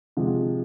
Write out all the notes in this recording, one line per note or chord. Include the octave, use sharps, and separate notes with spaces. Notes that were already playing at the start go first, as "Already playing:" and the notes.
C3 F3 G#3